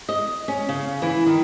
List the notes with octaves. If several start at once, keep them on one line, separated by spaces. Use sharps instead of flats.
D#5
C#4
C#3
E3
D#3